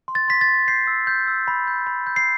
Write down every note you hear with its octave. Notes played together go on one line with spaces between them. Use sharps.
C6
A6
C6 B6
A6
C6
G6 C7
E6
G6
E6
B5
G6
B5
G6
C7